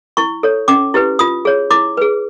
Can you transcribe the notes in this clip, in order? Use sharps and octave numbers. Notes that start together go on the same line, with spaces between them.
E4 C#6
A4 C#5
C#4 D6
E4 G4 B4
F4 D#6
G#4 C#5
E4 D6
G#4 B4